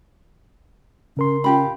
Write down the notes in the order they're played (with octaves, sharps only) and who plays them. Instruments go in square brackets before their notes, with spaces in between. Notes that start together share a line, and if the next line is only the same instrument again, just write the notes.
[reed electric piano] C#3 A#4 C6 [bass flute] C#4
[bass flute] C#4 [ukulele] F4 G4 B5